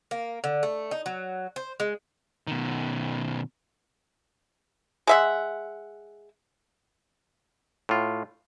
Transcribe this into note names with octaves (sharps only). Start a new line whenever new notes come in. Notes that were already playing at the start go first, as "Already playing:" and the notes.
A#3
D3
A3
D#4
F#3
C5
G#3
B2 D#3
G#3 E5 F#5
A2 F4